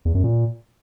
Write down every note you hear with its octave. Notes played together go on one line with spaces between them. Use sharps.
E2
F#2
A#2